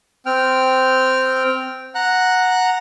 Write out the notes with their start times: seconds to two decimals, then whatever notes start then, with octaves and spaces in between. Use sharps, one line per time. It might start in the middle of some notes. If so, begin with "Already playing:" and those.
0.26 C4 G5 F6
1.95 F#5 A#5 F#6